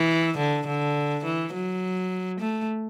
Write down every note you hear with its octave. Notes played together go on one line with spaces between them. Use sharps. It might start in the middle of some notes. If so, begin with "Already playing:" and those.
Already playing: E3
D3
D3
E3
F#3
A3